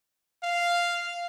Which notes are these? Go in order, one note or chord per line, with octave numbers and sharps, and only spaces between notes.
F5